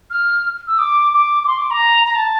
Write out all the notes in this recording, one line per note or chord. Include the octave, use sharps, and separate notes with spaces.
F6
E6
D6
D6
D6
C6
D6
A#5
A#5
A5